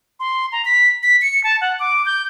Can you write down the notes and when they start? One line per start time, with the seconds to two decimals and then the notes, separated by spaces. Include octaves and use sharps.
0.20 C6
0.52 A#5
0.65 B6
1.03 B6
1.22 C#7
1.44 A5
1.61 F#5
1.79 D6
2.06 G6